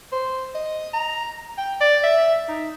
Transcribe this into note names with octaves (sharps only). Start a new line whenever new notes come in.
C5
D#5
A#5
G5
D5
E5
D#4